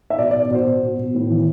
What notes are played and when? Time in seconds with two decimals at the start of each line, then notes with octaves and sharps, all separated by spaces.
0.10 E5
0.18 B2 D5
0.31 D5
0.35 B2
0.43 D5
0.51 B2 C5
0.66 B2
0.82 B2
0.98 B2
1.15 A2
1.30 E3